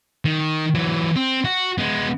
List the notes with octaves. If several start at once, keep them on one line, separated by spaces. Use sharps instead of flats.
D#3
E3 F#3
C4
F#4
G#3 B3